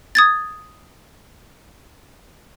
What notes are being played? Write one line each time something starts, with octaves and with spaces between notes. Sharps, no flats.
D#6 G#6 A6